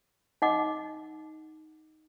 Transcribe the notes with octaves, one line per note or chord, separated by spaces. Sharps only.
D#4 D#5 F#5 D6